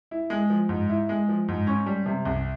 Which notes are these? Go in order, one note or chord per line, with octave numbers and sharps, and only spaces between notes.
E4
G#3
F3
G#2
E4
G#3
F3
G#2
C#4
G3
C3
C2